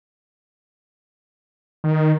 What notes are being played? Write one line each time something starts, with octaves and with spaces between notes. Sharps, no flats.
D#3